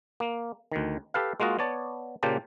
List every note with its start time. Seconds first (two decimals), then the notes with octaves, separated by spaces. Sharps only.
0.20 A#3
0.72 D2 D#3
1.14 G4 A4 B4 F5
1.40 G#3 A#3 F4 F#4 D#5
1.59 B3 C#5 D5 A5
2.23 A#2 C#3 A#3 G4 C5 A5